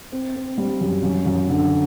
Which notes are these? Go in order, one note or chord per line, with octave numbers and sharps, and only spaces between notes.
C4
C4
G3
F#2
F#2
F#2
D3